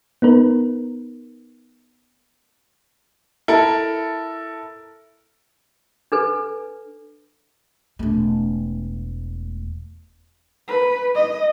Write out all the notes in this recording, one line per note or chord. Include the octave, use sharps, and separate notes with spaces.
B3 D#4 A#4 B4
E4 A4 A#4
D4 A4 B4
E1 A3
B4
D#5